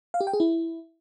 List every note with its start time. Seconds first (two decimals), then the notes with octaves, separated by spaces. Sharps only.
0.14 F5
0.21 G4
0.27 G5
0.33 G#4
0.40 E4